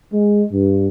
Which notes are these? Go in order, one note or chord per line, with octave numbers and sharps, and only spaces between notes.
G#3
G2